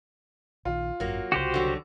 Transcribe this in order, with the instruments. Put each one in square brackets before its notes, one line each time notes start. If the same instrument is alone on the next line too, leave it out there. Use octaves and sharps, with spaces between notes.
[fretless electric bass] A#1 D#3 [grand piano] F4
[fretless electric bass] G#1 F#2 [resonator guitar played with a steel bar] F#3 A#3
[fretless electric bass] C2 C#3 [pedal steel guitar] F#4 G4 C5
[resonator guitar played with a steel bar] D3 F#3